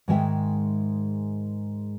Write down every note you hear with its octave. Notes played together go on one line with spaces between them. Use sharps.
G#2 D#3 G#3 E5 G5